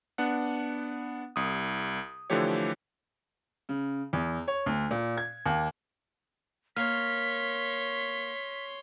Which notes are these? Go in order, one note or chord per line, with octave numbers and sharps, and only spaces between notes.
B3 D4 F#5
C2 D#6
D3 E3 F3 A3 G4 C#5
C#3
E2
C#5
D2
A#2
G#6
D#2
A#3 C#5 C6 F6 B6